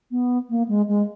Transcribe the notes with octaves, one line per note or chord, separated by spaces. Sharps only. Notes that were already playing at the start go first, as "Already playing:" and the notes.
B3
A#3
G#3
G#3